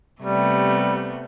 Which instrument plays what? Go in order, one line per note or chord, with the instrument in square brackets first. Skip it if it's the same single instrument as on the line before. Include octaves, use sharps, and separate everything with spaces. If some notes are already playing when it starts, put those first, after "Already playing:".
[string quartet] C3 A3 B3 [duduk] G3